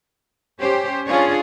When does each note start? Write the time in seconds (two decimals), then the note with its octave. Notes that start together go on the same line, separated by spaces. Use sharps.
0.59 C#4 G4 C5
1.06 C#4 D4 F4 G#4 C#5